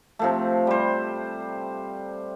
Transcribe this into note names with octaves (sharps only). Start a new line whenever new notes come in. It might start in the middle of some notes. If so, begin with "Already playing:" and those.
C3 F3 A3
G3 C5